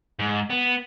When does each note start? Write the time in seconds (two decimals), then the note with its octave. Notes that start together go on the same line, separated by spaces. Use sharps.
0.19 G#2
0.50 B3